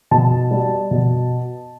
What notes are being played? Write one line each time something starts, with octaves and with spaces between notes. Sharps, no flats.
B2 A5
G3
B2